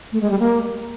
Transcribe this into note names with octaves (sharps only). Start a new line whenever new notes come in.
A3
G#3
G3
A#3